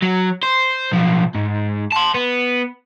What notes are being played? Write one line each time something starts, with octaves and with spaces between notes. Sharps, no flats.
F#3
C5
B1 F3
G#2
A5 C6
B3